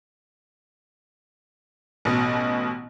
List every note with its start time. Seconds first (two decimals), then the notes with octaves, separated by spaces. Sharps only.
2.05 A1 B2